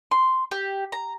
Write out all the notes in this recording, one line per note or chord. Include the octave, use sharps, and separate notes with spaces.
C6
G4
A#5